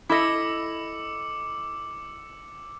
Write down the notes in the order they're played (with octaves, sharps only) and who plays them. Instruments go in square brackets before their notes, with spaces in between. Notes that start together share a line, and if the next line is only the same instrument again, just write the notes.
[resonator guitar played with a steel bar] E4 A4 D#5 [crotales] D6 E6 C#7